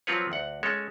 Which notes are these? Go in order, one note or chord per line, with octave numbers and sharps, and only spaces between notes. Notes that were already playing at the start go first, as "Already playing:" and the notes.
F3 F#3 C4 F4 B4 C#5
D2 F#5
G#3 C#4 A4 C#5